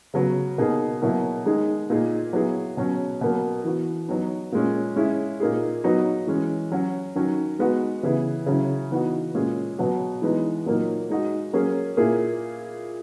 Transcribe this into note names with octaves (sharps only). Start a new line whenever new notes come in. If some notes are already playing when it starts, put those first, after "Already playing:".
C#3 F#3 B3 F#4
B2 A#3 D#4 G#4
B2 F#3 A#3 E4
D#3 G#3 D#4 G#4
A#2 A#3 D#4 G#4
F#3 B3 E4 G#4
B2 F#3 C#4
B2 F#3 A#3
E3 B3 F#4
F#3 B3 D#4
A#2 G#3 C#4
G#3 C#4 E4 G#4
A#2 A#3 D#4 G#4
F#3 B3 D#4 F#4
E3 G#3 C#4
F#3 C#4 F#4
D#3 F#3 C#4
G#3 B3 D#4 F#4
C#3 E3 B3 E4 G#4
C#3 F#3 C#4 E4
E3 B3 D#4 F#4
A#2 G#3 C#4 G#4
B2 F#3 B3 F#4
E3 G#3 B3 D#4
A#2 F#3 A#3 D#4
G#3 D#4 F#4
F#3 A#3 C#4 G#4
A#2 A#3 E4 G#4